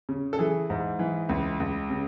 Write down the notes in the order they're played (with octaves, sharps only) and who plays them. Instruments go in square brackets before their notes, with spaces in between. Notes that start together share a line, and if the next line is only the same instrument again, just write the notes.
[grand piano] C#3
A4
E3 G#4
G#2
E3
C#2
C#2
C#3